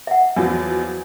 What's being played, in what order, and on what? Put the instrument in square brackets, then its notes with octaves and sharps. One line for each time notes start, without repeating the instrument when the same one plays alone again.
[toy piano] E5 F#5
[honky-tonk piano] E2 F3 F#3